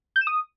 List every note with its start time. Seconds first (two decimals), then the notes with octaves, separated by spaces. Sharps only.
0.16 G6
0.21 E7
0.27 D#6